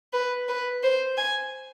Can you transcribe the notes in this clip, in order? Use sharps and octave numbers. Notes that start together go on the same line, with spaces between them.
B4
B4
C5
G#5